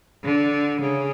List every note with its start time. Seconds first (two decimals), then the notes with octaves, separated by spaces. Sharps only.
0.24 D3
0.81 C#3